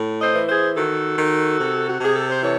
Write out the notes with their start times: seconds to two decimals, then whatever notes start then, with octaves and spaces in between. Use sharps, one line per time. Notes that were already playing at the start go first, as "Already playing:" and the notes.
Already playing: A2
0.21 C5 D#5
0.35 E3
0.49 G#4 C5
0.76 D#3 F#4 A4
1.18 D#3
1.60 C3
1.89 F#4
2.01 C3 G#4
2.16 A4
2.29 C5
2.43 E3 A4 C#5